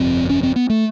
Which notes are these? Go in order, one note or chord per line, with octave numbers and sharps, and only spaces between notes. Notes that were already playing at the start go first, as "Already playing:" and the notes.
Already playing: G1 F2 C3 C4
C#4
C4
B3
A3